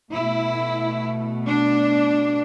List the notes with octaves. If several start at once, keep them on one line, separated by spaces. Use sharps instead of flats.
B2 A3 E4
D4